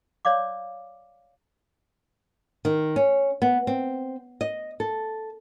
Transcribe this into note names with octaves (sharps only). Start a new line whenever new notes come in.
C#5 D5 F5 D6
D#3
C#4
B3
C4
D#5
A4